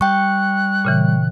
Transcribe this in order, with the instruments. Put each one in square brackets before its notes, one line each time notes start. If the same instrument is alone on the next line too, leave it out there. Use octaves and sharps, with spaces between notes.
[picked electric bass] G3 [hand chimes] G5 C#6 [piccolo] F#6
[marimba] A#2 C#3 E3